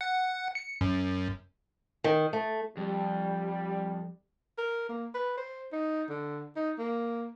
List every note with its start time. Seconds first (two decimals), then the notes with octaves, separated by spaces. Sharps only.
0.01 F#5
0.55 C#7
0.81 F#2
2.04 D#3
2.33 A3
2.77 F2 G3
4.58 A#4
4.89 A#3
5.14 B4
5.37 C5
5.72 D#4
6.09 D3
6.56 D#4
6.79 A#3